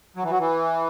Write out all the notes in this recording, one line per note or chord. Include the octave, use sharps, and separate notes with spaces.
F#3
E3
F#3
E3